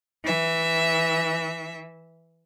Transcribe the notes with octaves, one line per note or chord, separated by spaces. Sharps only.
E3 E5